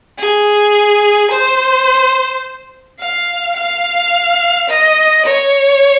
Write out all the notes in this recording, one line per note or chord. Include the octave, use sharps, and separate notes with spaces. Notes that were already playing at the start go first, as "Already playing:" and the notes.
G#4
C5
F5
F5
D#5
C#5